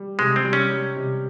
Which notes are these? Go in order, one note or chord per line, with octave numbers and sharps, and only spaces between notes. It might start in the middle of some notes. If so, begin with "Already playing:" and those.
Already playing: G3
C3 G#3
C4
G3
C#4
G3
C3